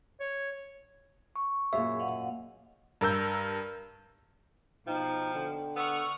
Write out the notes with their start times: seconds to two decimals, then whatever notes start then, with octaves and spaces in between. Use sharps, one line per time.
0.20 C#5
1.36 C#6
1.73 F#2 A#2 G#4 E5 F5
2.00 D#5 F5 F#5
3.01 G2 A#4 E6 G6
4.87 B2 F3 D#4 G5
5.34 D3
5.76 B3 F#5 C#6 E6 F6